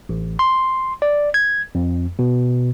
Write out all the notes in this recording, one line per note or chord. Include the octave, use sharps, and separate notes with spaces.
A1
C6
D5
G#6
F2
B2